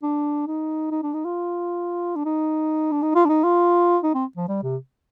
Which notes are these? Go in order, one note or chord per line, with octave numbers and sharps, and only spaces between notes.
D4
D#4
D#4
D4
D#4
F4
D4
D#4
D4
D#4
F4
D4
D#4
F4
D#4
C4
F3
G3
C3